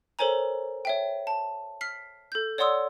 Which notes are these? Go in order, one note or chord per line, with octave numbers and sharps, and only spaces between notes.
A4 A#4 C5 C#5 G#5 A#5
C#5 E5 G5
A5
F6 B6 C7
A4 G6
C#5 D5 F#5 C6 D#6 E6